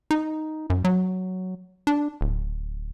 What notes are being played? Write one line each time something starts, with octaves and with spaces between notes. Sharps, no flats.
D#4
F#2
F#3
D4
D1